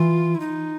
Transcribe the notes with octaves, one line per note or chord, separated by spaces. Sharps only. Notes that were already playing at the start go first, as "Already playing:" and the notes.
Already playing: E3 F4
E4
D#4